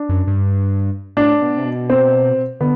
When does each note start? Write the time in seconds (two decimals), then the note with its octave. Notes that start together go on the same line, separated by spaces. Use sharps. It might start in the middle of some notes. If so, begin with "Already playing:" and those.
Already playing: D4
0.09 F#2
0.27 G2
1.17 A2 D4
1.41 B2
1.58 C3
1.65 B2
1.90 C4
2.61 D3 B3